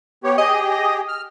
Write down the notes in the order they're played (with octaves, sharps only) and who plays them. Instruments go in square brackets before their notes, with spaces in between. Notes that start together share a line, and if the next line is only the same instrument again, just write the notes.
[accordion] B3 G4 C#5
[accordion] G4 G#4 [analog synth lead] D#5
[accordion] F6